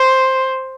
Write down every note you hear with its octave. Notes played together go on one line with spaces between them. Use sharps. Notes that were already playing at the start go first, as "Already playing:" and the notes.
Already playing: C5